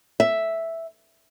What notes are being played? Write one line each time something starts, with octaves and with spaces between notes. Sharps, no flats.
E5